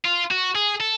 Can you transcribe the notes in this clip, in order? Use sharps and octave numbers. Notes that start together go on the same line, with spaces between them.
F4
F#4
G#4
A4